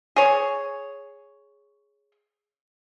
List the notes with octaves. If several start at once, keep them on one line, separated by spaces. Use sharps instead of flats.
G#4 C#5